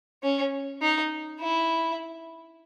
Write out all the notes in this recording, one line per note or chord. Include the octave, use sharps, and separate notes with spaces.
C#4
D#4
E4